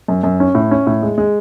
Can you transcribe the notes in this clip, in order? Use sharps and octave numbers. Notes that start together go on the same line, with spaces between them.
F#2
F#2
C#4
A2
C#4
A2
G#3
G#3